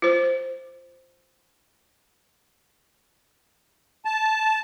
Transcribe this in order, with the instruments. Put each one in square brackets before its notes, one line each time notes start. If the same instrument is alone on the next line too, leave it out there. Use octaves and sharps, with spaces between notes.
[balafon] F4 C5
[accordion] A5